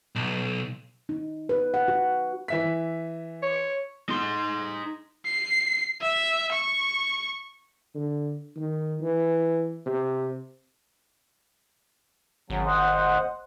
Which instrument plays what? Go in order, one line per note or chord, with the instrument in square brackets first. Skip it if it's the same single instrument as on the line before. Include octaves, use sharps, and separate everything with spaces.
[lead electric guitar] B1
[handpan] D#4
B4
F#5
F#4
[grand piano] E3 E5 B6
[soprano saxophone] C#5
[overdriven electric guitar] D#4 C6
[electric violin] C7
E5
C#6
[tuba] D3
D#3
E3
C3
[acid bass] G#1 [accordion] C#3 F#3
[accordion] C5 D#5 F#5